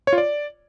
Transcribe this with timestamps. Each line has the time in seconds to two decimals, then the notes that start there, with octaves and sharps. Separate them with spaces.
0.07 C#5
0.13 F4
0.18 D5